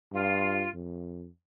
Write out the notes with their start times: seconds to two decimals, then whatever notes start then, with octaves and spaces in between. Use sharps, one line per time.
0.13 G2 F4 F5
0.74 F2